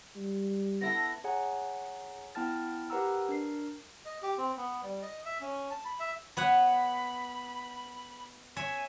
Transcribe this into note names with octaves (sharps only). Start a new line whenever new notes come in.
G3
B3 E4 A4 A#6
G#4 C#5 F#5 G#5 A#5
B3 E4 G5 A5 F6 A6
G4 A#4 B4 F#5 A#5 E6
D4 A#4 C7
D#5
G4
C4
B3
G3
D#5
E5
C#4
A5
B5
E5
B3 C#5 F#5 B5
C#5 E5 G#5